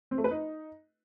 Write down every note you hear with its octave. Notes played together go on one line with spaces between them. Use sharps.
C4
A3
B4
D#4